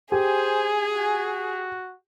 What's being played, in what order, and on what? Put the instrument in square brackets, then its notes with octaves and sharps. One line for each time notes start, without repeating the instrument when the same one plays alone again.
[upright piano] G4 [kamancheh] G#4 [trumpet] C5 [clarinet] G#5
[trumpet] F#4